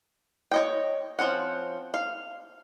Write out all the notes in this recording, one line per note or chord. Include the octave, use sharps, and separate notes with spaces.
C#5 D#5 G5
F3 C4 C#4 F#5
F5